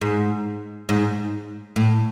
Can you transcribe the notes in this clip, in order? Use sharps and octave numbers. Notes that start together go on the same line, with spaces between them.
G#2
G#2
A2